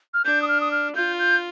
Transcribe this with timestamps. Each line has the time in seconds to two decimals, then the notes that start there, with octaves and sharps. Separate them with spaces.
0.14 F6
0.25 D4 G6
0.42 D#6
0.48 F6
0.61 D#6
0.71 F6
0.95 F4 G6
1.19 G6